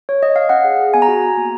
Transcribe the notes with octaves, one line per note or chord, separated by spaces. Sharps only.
C#5
D#5
F5
C#4 F#5
G#4
G#4
B3 G#5
A#5
F#4 G#5
F#4
A#3